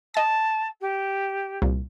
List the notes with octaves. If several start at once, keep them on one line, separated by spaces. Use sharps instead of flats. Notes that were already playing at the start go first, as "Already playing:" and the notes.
D#5 A5 A6
G4
C2 A#2